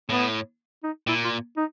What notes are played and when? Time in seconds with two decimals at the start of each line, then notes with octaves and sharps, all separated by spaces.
0.09 A2 B3
0.83 D#4
1.07 A#2 E4
1.24 F4
1.57 D#4